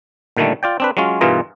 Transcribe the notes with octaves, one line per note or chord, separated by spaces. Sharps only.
A#2 D3 D#3 G3 A3
F4 D5 G5
C4 D4 B4
F#3 G#3 C#4 F4
G2 B2 E3 F4 G#4 A#4